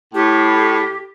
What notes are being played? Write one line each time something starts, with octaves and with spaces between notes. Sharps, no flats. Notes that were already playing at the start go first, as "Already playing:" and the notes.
A2 G4